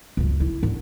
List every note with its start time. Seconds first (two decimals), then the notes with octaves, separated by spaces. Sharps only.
0.17 C#2 F#2
0.40 E4
0.63 D3